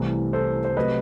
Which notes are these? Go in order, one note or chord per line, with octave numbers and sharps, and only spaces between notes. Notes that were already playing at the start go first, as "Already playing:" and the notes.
Already playing: C2 C3 E3 A3
A4 C5
C5
C3 F#3 A3 B4 D#5